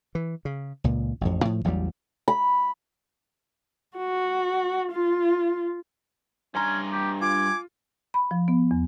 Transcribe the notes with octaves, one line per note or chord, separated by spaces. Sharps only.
E3
C#3
C#2 A#2
A1 F2
A2 F3
A1 E2 F#3 G3
B5
F#4
F4
G2 C#4 G#5 A#5 C6
G4
F4 G#5 D6
B5
F3
B3
E2